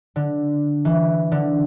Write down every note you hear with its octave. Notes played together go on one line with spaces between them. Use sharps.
D3
E3
D3